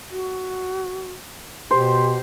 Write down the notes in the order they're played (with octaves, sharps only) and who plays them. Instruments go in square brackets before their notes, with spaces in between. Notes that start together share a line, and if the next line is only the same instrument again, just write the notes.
[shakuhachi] F#4
[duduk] B2 [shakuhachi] G4 [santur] C5